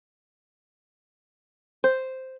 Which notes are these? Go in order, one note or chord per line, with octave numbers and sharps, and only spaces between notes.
C5